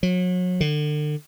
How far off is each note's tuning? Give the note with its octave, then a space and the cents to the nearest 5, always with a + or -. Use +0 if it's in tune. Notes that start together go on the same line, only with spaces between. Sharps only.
F#3 -35
D3 +35